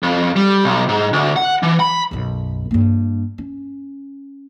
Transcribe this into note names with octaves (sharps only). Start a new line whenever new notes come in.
F2
G3
B1
G#2
D2
F#5
E3
B5
B1 F#2
G2 A#3
C#4